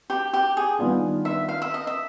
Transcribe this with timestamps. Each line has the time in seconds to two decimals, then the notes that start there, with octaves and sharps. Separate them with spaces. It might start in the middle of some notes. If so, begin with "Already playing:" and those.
0.10 G4
0.33 G4
0.57 G#4
0.79 D#3 G3 B3 D4 F4
1.25 E5
1.49 F5
1.62 E5
1.74 D#5
1.87 E5